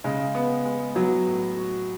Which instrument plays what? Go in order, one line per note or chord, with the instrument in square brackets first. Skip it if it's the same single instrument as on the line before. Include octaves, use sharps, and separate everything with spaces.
[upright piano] C#3 [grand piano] G#3
[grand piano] B3
G#3
[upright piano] F#3 [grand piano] B3
[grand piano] A2
F#4